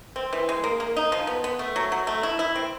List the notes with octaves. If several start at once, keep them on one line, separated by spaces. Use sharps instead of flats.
C4
E3
G#3
A#3
A#3
D#4
F3
B3
B3
A3
F#3
F#3
A3
E4
E4
C4